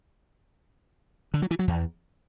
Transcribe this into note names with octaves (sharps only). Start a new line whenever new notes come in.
D3
F#3
E3
F#3
E2